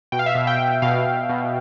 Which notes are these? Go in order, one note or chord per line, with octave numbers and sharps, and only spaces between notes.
B2 G5
F5
E5
B2 F5
G5
B2
B2 F5
B2
B2